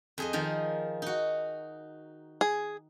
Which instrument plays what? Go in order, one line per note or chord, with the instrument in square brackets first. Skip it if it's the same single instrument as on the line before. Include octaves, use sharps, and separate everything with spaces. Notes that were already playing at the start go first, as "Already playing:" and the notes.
[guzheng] F2 G#4 D#5
D#3 F3 A#4
D#4 F#4
[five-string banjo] G#4